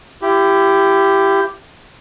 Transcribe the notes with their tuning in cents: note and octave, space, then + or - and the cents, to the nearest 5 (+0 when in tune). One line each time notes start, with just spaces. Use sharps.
E4 +30 G4 +0